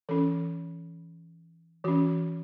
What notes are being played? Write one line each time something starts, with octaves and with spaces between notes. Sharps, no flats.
E3 C#4 A4
E3 C#4 F#4